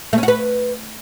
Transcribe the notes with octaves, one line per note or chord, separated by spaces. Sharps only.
A3
C#4
F#4
B4